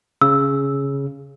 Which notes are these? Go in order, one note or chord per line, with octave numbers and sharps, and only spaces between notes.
C#3 E6